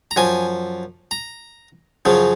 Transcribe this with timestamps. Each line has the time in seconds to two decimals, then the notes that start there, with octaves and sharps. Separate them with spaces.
0.11 A#5
0.16 F#2 F3 G#5
1.11 A#5
2.05 F#2 C#3 F3